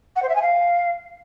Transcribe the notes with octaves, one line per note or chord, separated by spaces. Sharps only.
F#5
C5
E5
G#5
F5